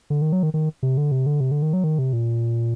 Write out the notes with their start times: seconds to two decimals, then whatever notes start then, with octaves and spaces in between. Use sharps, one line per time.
0.10 D3
0.22 D#3
0.33 F#3
0.43 D#3
0.54 D#3
0.83 C3
0.97 D3
1.12 C3
1.26 D3
1.40 C3
1.51 D3
1.62 D#3
1.73 F#3
1.84 D#3
1.99 C3
2.13 A#2